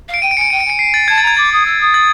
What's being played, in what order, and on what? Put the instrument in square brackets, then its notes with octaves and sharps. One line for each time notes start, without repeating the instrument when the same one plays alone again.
[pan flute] F5
[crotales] D7
[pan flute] G5 [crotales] D#7
[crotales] D7
[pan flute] G#5 [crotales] C#7
[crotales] D7
[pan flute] G5 [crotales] D#7
[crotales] D7
[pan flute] G#5 [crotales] C#7
[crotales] C7
A6
[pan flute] A5 [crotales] G#6
[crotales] A6
[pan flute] A#5
[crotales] G#6
[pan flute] D6 [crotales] A6
[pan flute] D#6
E6
D#6
[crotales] A6